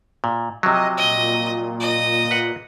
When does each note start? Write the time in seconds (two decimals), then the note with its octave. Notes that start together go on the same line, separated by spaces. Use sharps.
0.24 A#2
0.63 C3 F3 F#3 D#5
0.97 A#2 D#5
1.80 D#5
2.31 B4 F#5